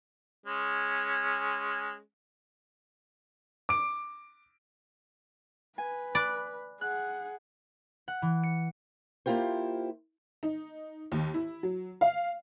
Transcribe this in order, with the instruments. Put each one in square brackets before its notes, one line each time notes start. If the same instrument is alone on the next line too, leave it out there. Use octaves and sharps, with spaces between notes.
[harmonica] G#3 C#4
[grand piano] D6 D7
[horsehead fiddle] B4 [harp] G#5
[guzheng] D5 [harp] B5 F#6
[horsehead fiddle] G#4 F#5 [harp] F#6
[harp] F#5
E3
C#7
[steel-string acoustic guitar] A#3 E4 F4 G4 C5
[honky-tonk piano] D#4
D#2
E4
F#3
F5